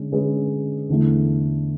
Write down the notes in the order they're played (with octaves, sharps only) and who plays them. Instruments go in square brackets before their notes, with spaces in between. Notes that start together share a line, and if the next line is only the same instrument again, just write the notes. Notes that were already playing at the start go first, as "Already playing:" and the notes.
Already playing: [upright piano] D3 G#3 C#4
D3 G#3 C#4 G#4 B4
E2 D3 A3